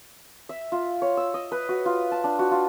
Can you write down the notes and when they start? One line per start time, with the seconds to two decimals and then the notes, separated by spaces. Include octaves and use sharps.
0.49 E5
0.72 F4
1.02 C#5
1.17 E6
1.34 D#5
1.52 B4
1.69 F#4
1.86 F4
2.12 A5
2.24 D4
2.39 F#4
2.51 F4